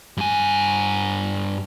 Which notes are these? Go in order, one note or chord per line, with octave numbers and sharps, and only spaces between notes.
G2 G#5